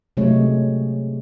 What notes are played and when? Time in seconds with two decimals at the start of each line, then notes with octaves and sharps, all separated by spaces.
0.17 C3 F#3 G#3 A3 C#5